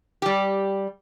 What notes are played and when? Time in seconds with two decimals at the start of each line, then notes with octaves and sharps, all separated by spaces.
0.22 G3 G4